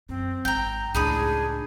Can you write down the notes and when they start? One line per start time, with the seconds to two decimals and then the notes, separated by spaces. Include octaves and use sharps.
0.09 F#2 C4
0.45 G#1 G5 A#5
0.95 C#2 A2 D4 D#4 G#4 B5 D#6